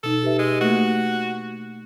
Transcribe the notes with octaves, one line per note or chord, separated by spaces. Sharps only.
B2 D#4 A4
G4 B4 E5
G#3
A3 A#3 F#4